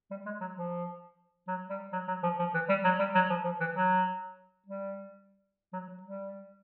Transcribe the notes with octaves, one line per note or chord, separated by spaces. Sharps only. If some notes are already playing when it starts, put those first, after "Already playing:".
G3
G#3
F#3
F3
F#3
G3
F#3
F#3
F3
F3
E3
G3
F#3
G3
F#3
F3
F3
E3
F#3
G3
F#3
F#3
G3